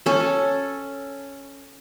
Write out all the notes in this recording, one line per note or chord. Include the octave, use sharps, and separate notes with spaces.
C#4 A4